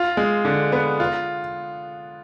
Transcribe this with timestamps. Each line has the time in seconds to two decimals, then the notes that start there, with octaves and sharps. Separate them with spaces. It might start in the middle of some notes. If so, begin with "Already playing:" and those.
Already playing: F4
0.17 G#3
0.45 D3
0.72 B3
1.00 F4